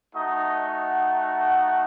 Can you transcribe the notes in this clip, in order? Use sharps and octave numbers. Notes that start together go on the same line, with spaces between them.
A3 D#4 F#4 D#5
F#5